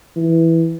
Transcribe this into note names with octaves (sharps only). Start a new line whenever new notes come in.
E3